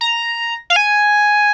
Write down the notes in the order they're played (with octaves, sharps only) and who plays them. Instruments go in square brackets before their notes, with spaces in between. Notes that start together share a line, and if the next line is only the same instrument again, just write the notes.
[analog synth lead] A#5
F5
G#5